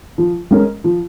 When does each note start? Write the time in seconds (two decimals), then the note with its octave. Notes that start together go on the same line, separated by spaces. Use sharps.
0.18 F3
0.51 G#3 C#4 A#4
0.84 F3